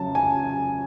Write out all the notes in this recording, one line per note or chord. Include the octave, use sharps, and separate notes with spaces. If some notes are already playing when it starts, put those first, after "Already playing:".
Already playing: C#3 F#3 A5
G#5